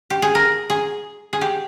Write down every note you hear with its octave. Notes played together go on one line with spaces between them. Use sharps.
G4
G#4
A#4
G#4
G#4
G4